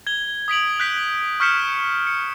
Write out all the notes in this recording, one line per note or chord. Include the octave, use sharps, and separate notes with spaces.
G#6 G7
D#6 B6 D7 F#7
F#6 G6 B6 D7
C#6 F6 G6 B6 C#7 E7
C#7